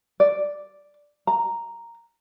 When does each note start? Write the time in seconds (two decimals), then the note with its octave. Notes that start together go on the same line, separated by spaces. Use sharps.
0.20 D5
1.27 A#5